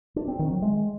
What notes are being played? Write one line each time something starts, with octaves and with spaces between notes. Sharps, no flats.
D4
C4
D#3
F#3
G#3